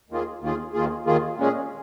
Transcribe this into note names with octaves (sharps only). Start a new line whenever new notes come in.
D#2 D#3 A#3 F4 G#4
D#2 D#3 A#3 F4 G#4
D#2 D#3 A#3 F4 G#4
D#2 D#3 A#3 F4 G#4
A#2 G#3 C#4 G#4